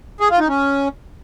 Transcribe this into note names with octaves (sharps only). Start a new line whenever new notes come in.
G#4
F4
D#4
C#4